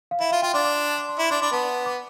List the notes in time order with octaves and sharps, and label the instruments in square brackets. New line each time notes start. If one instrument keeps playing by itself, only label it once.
[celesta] F5
[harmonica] E4 [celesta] E5
[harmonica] F4 [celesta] F5
[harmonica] F4 [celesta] G5
[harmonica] D4 [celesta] C6
[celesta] D6
C6
A5
C6
C6
[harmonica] E4 [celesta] D6
[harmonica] D4 [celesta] C6
[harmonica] D4 [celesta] B5
[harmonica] B3 [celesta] A5
[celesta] D6